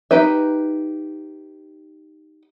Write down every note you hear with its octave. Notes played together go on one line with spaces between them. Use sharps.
D#4 G4 B4 E5